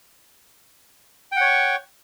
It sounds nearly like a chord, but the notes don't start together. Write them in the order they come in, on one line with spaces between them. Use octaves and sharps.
G5 F#5 C#5 C#6